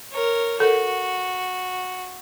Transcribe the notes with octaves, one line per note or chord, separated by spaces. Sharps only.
A#4 C#5
F#4 A4 A#4